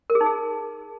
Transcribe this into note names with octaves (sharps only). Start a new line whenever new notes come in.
A#4
G#4
D#4
G#4